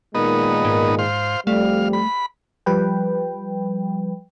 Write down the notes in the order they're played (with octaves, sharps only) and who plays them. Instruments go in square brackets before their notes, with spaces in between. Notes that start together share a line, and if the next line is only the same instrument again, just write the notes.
[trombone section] A#2 D#3 G#3 [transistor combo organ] B3 D#4
[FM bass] G#2
[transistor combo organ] C5 F5
[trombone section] F2 G3 [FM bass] A3 [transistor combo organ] F5
[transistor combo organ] B5
[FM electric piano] F3 G3 B4 G5